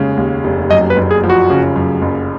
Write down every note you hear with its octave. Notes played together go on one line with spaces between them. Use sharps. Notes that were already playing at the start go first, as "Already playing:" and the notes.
Already playing: F1 D#2 C#3 G#3
D#2
F1
F#2 D#5
B4
F#1
G#4
F3
F#4
C#3
F#2
F#1